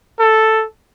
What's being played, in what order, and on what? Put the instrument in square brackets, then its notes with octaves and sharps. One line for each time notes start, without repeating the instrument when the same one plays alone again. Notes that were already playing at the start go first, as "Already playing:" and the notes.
[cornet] A4